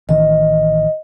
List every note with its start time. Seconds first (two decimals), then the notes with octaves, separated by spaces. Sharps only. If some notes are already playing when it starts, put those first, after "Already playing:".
0.09 A1 D#3 E3 D#5